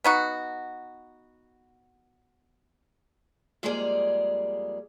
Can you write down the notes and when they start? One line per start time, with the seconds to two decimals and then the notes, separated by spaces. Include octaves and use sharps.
0.04 B3 D#4 F#4
3.63 F2 G3 G#3 A#3 G#4 D5